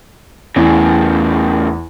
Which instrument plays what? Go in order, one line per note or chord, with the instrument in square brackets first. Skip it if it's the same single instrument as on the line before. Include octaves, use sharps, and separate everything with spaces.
[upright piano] E2 [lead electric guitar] A2 C#3